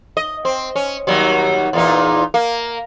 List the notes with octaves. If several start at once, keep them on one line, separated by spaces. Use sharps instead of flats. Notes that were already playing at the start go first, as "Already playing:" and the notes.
D#5
C4
C#4
D#2 F#3 G3
E2 A#2 D#4
A#3